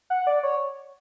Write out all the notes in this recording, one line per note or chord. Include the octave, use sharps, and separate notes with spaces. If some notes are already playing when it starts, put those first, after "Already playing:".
F#5
D5
C#5